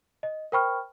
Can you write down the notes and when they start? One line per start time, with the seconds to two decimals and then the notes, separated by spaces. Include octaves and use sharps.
0.23 D#5
0.52 A#4 C5 G5 B5 C#6 F6